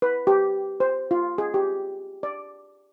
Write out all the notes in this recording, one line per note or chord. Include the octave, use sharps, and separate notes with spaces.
B4
G4
C5
F4
G#4
G4
D5